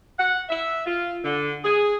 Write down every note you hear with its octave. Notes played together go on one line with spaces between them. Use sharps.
F#5
E5
F4
D3
G#4